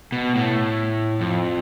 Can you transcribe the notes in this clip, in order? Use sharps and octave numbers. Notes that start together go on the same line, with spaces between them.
B2
A2
F2